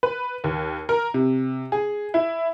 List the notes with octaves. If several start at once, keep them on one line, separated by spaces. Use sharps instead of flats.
B4
D#2
A#4
C3
G#4
E4